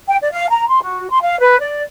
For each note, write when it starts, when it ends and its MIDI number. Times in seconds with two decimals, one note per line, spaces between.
0.07 0.15 79
0.20 0.27 74
0.32 0.45 77
0.49 0.67 82
0.67 0.81 84
0.82 1.06 66
1.09 1.21 84
1.21 1.39 77
1.39 1.56 71
1.60 1.82 74